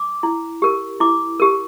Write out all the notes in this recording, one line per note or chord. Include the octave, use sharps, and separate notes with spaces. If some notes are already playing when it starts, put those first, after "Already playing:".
Already playing: D6
E4
G4 A#4
E4 D6
G4 A#4